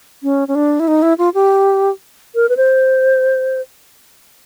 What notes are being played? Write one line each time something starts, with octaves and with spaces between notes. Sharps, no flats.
C#4
C#4
D4
E4
D#4
E4
F4
G4
A#4
B4
C5